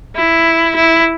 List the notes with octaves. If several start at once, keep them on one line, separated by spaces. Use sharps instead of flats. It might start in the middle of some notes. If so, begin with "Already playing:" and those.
E4
E4